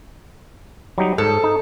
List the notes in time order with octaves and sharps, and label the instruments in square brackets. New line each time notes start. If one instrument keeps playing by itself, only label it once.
[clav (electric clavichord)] F#3 G3 D#4
[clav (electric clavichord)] G#2 [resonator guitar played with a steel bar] A4
[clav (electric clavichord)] D#4